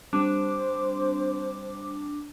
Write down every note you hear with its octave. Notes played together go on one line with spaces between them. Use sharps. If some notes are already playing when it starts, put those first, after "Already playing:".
G3 C4 D4 C5 D6